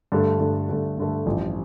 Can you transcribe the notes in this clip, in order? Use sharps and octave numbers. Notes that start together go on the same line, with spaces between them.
G2 D3 A3
G2 D3 A3
G2 D3 A3
G2 D3 A3
A1 G2 F3